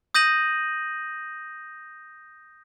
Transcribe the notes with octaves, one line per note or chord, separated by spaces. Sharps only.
D#6 G6 A#6 D#7 F#7